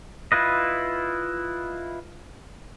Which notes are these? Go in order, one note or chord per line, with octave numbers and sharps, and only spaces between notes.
E4 F4 B4 D#5